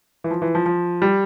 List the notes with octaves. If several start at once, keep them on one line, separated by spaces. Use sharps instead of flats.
E3
F3
E3
F3
F3
G3